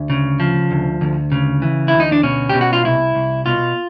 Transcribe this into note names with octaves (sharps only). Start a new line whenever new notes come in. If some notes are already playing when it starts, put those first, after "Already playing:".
Already playing: D2
C#3
F3
D2
D2
C#3
E3
D2 E4
D#4
D4
B2 C#4
B2 G4
F#4
F4
C2 E4
C2
B2 F4